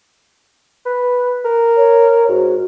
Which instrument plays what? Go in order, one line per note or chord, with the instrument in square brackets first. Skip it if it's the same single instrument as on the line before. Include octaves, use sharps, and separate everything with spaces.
[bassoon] B4
A#4
[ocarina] C#5
[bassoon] G#2 [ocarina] F#4